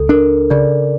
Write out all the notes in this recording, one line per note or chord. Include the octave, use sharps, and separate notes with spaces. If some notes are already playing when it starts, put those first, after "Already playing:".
Already playing: C#2 A4
D4 A#4
C#3 D5